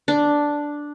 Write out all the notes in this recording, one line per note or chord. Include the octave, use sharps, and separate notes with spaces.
D4